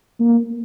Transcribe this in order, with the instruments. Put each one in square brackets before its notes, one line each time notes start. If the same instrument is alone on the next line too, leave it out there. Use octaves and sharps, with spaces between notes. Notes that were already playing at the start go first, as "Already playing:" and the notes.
[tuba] A#3